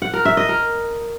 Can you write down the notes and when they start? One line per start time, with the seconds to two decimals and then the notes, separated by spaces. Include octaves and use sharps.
0.02 F#5
0.14 A#4
0.25 E5
0.37 D#5
0.49 A#4